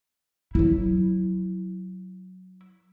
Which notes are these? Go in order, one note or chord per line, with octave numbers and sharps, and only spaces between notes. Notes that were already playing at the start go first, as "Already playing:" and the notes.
F#3 E4